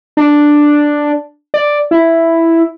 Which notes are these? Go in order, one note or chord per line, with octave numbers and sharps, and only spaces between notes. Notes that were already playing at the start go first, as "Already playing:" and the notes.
D4
D5
E4